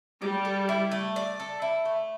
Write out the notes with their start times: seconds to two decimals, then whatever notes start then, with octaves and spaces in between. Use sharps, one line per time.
0.22 G3 D5
0.45 A4
0.69 E4
0.91 A3
1.16 D5
1.40 A4
1.62 E4
1.85 A3